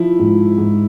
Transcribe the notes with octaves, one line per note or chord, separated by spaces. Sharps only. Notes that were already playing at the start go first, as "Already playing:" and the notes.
Already playing: F3 E4
G#2
G#2